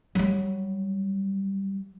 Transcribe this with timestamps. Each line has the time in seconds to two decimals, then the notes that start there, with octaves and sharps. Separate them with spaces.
0.15 F#3 G3